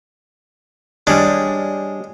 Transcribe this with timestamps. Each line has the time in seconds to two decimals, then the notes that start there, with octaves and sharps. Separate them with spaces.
1.07 G3 G#3 C#4 D4